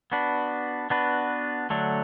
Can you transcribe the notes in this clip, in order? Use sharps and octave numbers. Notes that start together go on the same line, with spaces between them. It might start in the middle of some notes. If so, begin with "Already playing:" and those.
B3 D4 F#4 B4
B3 D4 F#4 B4
D3 F#3 A3 D4